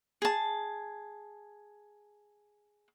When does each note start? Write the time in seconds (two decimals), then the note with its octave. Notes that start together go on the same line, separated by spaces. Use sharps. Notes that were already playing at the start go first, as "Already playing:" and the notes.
0.22 G#4 A5